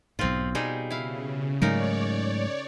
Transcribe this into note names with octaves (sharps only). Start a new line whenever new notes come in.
B1 G#2 C4 F4
B2 G3 D#4 G#4
C#3 E4 F5
G#2 C#3 F#3 A3 D#4 A#4 C#5 D5